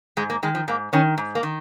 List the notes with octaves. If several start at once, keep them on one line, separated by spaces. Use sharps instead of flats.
G#2 G#3
A#3
D#3 G#3
F3
G#2 A#3
D#3 C#4
G#2
A#3
D#3